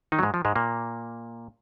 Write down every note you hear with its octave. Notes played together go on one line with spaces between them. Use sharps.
D#3 D#4
F#3
G#2 G#3
F3
G#2 G#3
A#2 A#3